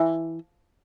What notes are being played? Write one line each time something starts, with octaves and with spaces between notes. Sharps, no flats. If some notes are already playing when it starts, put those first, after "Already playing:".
Already playing: E3